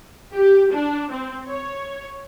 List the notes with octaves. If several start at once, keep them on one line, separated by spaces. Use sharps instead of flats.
G4
D4
C4
C#5